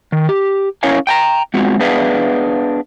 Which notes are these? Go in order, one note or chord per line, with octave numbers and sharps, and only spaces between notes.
D#3
G4
C#4 E4 A#4 C#5 F5 G#5
G5 A5 A#5
G#3 B3 C4 F4 F#4
B3 D4 G#4 B4 E5 F5